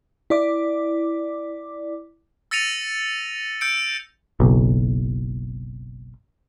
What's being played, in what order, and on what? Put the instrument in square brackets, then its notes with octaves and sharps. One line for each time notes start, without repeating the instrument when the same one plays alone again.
[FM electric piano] E4 D5 D6
[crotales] E6 A6 A#6 C#7 D#7 F7
E6 G6 C#7 D7
[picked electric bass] F#1 B1